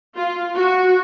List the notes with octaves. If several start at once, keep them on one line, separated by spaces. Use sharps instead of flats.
F4
F#4